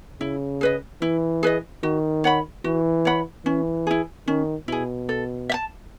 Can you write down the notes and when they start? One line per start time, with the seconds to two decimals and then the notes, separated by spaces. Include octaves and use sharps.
0.21 C#3 E4
0.61 G#4 B4 D#5
1.01 E3 E4
1.43 G#4 B4 D#5
1.83 D#3 F#4
2.24 C#5 F#5 B5
2.64 E3 F#4
3.05 C#5 F#5 B5
3.45 E3 C#4
3.87 E4 G#4
4.27 D#3 C#4
4.68 B2 E4 G#4
5.09 A4
5.49 E5
5.54 A5